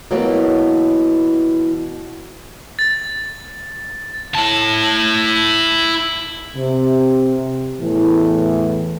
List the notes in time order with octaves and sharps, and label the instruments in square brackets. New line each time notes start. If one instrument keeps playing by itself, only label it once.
[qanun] B2 F#3 G5 [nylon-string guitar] E3 A#3
[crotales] A6
[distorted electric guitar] E4 A5
[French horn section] C3
E2 A2 E3